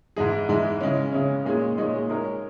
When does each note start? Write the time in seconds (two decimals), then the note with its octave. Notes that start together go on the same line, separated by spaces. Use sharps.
0.16 G#2 E3 G#3 D#4 G#4
0.48 G#2 E3 G#3 D#4 G#4
0.81 C#3 G#3 C#4
1.12 C#3 G#3 C#4
1.45 A#2 G#3 D#4 G#4 C#5
1.77 A#2 G#3 D#4 G#4 C#5
2.09 G#3 D#4 A#4 C#5